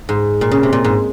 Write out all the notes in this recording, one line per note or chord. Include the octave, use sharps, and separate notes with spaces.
G#2
A#2
C#3
C3
A#2
G#2